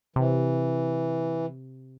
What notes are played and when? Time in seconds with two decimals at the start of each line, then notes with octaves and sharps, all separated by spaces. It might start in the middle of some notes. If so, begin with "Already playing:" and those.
0.16 C3 E3